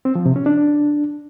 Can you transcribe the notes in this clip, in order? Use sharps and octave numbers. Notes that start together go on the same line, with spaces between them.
C4
F3
C3
C#4
D4